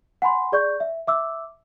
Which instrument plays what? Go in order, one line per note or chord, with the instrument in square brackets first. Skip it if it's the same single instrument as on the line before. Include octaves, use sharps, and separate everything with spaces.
[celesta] F#5 G#5 B5 C6
G#4 D5 C#6 G6
E5
E5 D6 E6